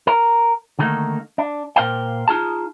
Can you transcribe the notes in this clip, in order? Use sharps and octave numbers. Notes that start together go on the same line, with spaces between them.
A#4
D3 D#3 G3 A3 A#3 D#4
D4
A#2 A#4 C5 F5 G5
D#4 F4 G#4 A5